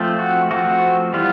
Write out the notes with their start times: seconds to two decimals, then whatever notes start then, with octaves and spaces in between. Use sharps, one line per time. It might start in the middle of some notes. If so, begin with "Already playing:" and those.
Already playing: F3 A3 C4
0.19 F#4
0.51 F3 A3 C4 F#4
1.13 E3 G3 B3 F4